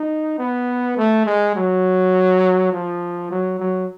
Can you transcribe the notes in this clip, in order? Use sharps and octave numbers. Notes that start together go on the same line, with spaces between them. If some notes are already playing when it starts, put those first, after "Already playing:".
Already playing: D#4
B3
A3
G#3
F#3
F3
F#3
F#3